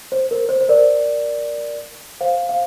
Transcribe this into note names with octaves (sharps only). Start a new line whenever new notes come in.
C5
A#4
C5
C5
A#4 D5
C5 F5
F5